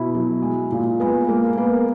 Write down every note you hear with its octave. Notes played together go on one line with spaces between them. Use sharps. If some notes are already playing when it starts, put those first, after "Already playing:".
Already playing: B2 E4
F#3
G#3
A#2
G#3 B3
G#3 A#3
A#3 B3